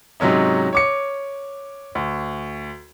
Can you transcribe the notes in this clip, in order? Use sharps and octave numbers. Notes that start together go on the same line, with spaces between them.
G#2 C3 F#3 C#4 D#4
C#5 D6 C#7
D2